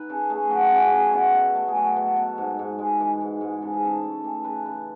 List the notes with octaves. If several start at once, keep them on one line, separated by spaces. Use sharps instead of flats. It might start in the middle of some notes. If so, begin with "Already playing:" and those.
Already playing: D#4 B4
C#3 A4
A3 G#4
F#3 F#4
C#3
C#3
B2 E4 F#4
B2
A4
A3
G#4
F#3 A4
B2
A4
B2
G#2
G#2
G#3
E3
G#2
G#2
C#3 A4
G#4
C#3 A4
A3
E3 A4
C#3 B4
C#3 B4